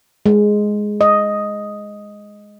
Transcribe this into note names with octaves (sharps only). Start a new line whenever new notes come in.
G#3
D#5